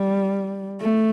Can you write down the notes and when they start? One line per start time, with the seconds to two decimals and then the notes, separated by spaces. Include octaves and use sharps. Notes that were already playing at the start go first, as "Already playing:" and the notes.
Already playing: G3
0.81 A3